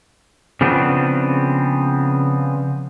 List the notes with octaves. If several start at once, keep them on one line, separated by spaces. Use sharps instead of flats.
C#3 F3 B3 C4 D4